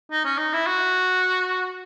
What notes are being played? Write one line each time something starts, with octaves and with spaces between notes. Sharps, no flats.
D#4
C#4
D#4
E4
F#4